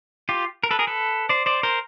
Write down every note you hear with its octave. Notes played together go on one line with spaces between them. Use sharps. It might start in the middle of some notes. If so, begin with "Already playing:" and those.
F4 G4
A#4
A4 B4
G#4 A#4
A4 B4
C5 D5
C5 D5
A#4 C5